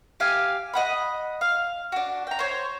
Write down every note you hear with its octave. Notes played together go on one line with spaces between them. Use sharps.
G4 F5 G#5
D#5 F#5 B5
F5
D4 F#4
G5 A#5
C5 C#5